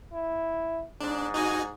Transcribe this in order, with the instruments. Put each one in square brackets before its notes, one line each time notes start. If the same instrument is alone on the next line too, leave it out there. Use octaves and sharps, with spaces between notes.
[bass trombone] E4
[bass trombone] G#2 [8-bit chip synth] D4
[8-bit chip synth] D#4 F#4 G#5